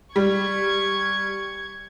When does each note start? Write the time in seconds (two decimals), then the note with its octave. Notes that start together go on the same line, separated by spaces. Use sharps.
0.16 G3 C#6 G#6